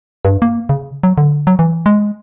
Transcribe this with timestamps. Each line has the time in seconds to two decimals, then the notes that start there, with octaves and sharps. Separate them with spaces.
0.25 G2
0.42 A#3
0.69 C#3
1.03 F#3
1.18 D3
1.47 F#3
1.59 E3
1.86 G#3